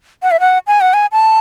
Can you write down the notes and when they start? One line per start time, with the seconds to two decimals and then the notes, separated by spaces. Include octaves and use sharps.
0.23 F#5
0.31 E5
0.40 F#5
0.67 G#5
0.81 F#5
0.94 G#5
1.12 A5